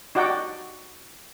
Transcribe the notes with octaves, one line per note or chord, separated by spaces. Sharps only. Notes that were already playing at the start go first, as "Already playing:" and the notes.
D#4 F#4 D5 F#5 G5